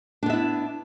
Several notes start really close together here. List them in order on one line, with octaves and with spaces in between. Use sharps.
D4 B3 E5 E4